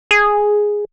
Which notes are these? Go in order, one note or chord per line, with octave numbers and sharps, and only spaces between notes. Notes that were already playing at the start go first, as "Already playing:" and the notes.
G#4